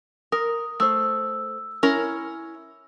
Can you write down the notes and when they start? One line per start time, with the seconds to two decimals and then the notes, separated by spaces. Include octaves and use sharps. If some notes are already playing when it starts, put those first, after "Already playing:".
0.32 A#4 D#6
0.80 A3 C5 D#6 E6
1.83 C#4 E4 A#4